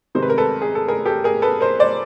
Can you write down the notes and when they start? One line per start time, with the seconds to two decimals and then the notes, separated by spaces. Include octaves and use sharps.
0.15 C3 D#3 G#3 C4 C5
0.22 B4
0.30 A#4
0.38 A4 B4
0.62 G#4
0.75 A4
0.88 G#4 A#4
1.06 G4 A4
1.24 G#4 A#4
1.42 A4 B4
1.61 A#4 C5
1.79 C5 D5